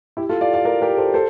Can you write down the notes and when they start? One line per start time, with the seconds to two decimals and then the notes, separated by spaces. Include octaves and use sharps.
0.17 E4 G4
0.29 F4 A4
0.41 D5 F5
0.54 D5 F5
0.65 A#4 D5
0.81 G4 A#4
0.97 A4 C5
1.14 A4 C5